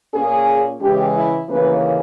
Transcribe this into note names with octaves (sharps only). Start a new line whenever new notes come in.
A#2 A#3 C#4 G#4
C#3 E3 G#3 C#4 G4
E4
D#2 C#3 E3 A#3 C#4 B4